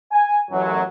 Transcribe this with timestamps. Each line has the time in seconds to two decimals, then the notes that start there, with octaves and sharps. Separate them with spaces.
0.12 G#5
0.51 A1 F#2 F#3